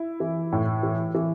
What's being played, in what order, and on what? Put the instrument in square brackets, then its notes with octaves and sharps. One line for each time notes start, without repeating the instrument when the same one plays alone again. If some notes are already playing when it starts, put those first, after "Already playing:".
Already playing: [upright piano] E4
E3
A2
E3
E3